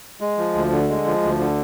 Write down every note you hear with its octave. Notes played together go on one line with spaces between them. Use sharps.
G#3
F3
D2
D3
G#3
F3
D2
D3